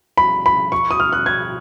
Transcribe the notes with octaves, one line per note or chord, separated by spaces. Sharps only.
B5
B5
C#6
D#6
F6
F#6
G#6